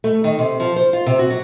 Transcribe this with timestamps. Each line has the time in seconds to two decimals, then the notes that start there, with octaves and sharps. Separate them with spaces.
0.04 A3
0.24 D#3
0.39 C3
0.60 F3
0.76 C5
0.93 F4
1.06 C3
1.19 F#4
1.30 F#3